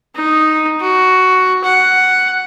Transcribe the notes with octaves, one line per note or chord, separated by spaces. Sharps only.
D#4
F#4
F#5